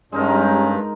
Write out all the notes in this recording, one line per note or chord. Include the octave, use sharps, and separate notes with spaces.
G2 G3 G#3 C#4 D#4 A#4